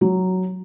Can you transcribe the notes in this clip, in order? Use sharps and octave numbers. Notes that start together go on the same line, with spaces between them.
F#3